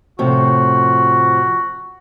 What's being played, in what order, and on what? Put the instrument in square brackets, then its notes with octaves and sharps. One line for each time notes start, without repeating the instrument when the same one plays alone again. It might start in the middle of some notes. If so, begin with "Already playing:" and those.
[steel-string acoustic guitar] A2 C3 F3 [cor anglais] F#4